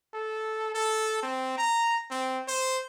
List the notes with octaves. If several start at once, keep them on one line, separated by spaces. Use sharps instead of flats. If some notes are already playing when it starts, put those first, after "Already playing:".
A4
A4
C4
A#5
C4
C5